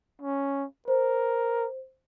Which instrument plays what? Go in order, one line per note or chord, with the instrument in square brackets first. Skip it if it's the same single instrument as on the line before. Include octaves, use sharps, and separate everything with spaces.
[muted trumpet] C#4
[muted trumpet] A#4 [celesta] C5